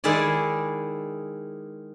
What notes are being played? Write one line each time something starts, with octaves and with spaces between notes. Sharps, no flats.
D#3 G#3 E4 G#4 D5